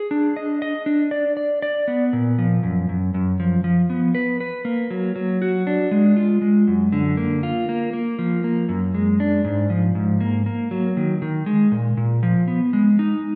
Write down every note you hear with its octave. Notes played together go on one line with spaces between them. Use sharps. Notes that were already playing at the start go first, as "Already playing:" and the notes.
Already playing: G#4
D4
D#5
D#5
D4
D5
D5
D5
B3
A#2
F3
F#2
F#2
F#2
F3
F3
B3
B4
B4
A#3
F#3
F#3
F#4
D4
G#3
F4
G#3
F#2
D3
A#3
F4
A#3
A#3
F3
A#3
F#2
G#3
D4
G#2
F3
G#2
A#3
A#3
F#3
D#3
D#3
G#3
A#2
A#2
F3
B3
G#3
D#4